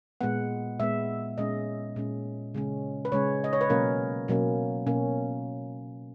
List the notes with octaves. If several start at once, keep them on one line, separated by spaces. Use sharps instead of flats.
A#2 G#3 B3 F#5
A#2 G#3 B3 E5
A#2 G#3 C#4 D#5
A#2 G#3 C#4
C#3 G#3 C#4
B4
C#3 G#3 C#4 C#5
D#5
C#5
B4
B2 F#3 A#3 C#4 A#4
B2 F#3 A#3 C#4
B2 A#3 C#4